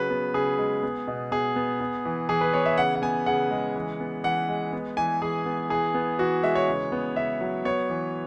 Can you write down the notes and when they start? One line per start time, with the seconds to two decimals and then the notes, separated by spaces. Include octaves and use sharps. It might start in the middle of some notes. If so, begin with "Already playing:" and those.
Already playing: C#3 F#3 B4
0.10 B3
0.34 C#3 G#4
0.58 G#3
0.83 B3
1.08 B2
1.32 B2 G#4
1.56 B3
1.80 B3
2.05 E3
2.29 E3 G#4
2.41 B4
2.53 B3 C#5
2.66 E5
2.78 C#3 F#5
2.95 F#5
3.02 B3 G#5
3.26 C#3 F#5
3.51 G#3
3.75 E3
4.00 B3
4.24 E3 F#5
4.49 G#3
4.73 B3
4.97 E3 G#5
5.22 E3 G#4
5.46 B3
5.70 E3 G#4
5.94 B3
6.19 E3 F#4
6.43 G#3 E5
6.55 C#5
6.68 C#3
6.92 B3
7.16 C#3 E5
7.41 F#3
7.65 B3 C#5
7.90 E3